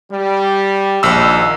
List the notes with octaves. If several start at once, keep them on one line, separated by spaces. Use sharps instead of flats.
G3
A#1 D#2 E6